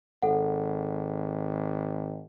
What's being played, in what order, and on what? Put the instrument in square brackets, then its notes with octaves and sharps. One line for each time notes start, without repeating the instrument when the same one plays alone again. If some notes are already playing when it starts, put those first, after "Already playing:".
[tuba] G#1 [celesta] A4 F#5